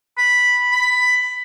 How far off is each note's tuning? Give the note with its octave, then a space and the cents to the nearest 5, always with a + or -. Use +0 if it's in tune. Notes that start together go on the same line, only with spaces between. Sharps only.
B5 -5
B5 +15